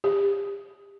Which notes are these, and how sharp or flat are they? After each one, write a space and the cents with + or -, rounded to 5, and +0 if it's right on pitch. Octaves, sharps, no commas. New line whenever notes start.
G4 +30